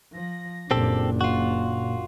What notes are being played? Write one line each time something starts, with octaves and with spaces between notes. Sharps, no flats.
F3 A#6
F#1 A#2 C4 D4 G4 A4
F4 F#4